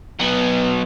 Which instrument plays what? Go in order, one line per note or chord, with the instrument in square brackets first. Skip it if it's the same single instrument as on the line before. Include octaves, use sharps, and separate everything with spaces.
[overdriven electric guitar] F#3 B3